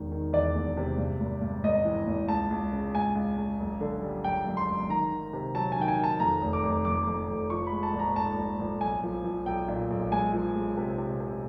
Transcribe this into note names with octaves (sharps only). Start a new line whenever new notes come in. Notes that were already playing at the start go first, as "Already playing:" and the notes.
Already playing: E1 D#3
D#3
E2 D5
E1
C3
G2
G#1
G2
G#1 D#5
E3
G#1
C#2 A5
C#2
C#3
C#2 G#5
C#2
C#2
F#1
D3
G3
F#2 G5
F#1
C6
F#1
D#3 A#5
D#3
C3
F#3 A5
D#3 G#5
G5
G#5
D#3 A5
F2 A#5
F1
D6
F1
F2 D6
F2
F1
F3 C#6
B5
G#3
A5
A#1
A#5
G#2 A5
A#1
A#1
B1 G#5
F3
F3
B1 G5
A#2
B1
G#3 G#5
F3
G#3
C3
C3
C3